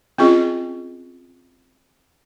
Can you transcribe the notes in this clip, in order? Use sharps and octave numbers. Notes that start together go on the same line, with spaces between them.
C4 C#4 F4 G#4 D#5